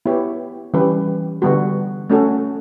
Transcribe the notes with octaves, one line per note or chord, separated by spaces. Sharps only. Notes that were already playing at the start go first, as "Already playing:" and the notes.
B3 E4 G4 C#5
E3 G3 C#4 G4 B4
D3 G3 B3 F#4
A3 C#4 F#4 A4 C#5